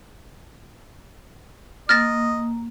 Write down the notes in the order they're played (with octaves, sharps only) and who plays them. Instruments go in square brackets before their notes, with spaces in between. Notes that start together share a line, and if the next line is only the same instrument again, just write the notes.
[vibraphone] A#3 [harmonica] D#5 [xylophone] F6 A6 A#6